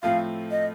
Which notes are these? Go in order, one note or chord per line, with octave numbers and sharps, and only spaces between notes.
A2 F3 A3 C4 F4 F5
D#5